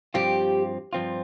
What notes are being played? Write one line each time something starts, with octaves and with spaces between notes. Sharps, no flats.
G2 F3 C4 F4 G4
G2 F3 C4 F4